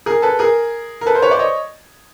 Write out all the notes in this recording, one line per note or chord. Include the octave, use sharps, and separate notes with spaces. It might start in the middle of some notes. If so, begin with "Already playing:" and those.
G#4 A#4
A4 B4
G#4 A#4
A#4
A4 B4
A#4 C5
B4 C#5
C5 D5
C#5 D#5